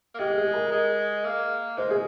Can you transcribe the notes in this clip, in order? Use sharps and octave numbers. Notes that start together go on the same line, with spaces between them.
A#3
G#3 G4
G#4
A#4
G#3
A#3
G#3 C5
G#4